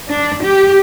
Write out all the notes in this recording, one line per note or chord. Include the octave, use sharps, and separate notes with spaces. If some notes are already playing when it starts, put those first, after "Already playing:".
D4
G4